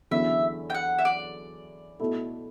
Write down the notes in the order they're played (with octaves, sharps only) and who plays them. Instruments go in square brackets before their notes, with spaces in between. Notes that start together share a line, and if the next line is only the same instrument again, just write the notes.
[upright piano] E2 D3 F#3 C#4 E4 [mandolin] E5
[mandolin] G5
F#5
E5
D5
[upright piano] B2 A3 E4 A4